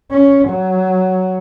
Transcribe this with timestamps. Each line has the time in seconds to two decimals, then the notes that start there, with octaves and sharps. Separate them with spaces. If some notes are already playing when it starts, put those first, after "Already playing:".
0.11 C#4
0.48 F#3